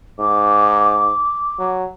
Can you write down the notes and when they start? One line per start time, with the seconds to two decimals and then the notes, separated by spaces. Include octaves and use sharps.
0.19 G#2 D6
1.59 F#3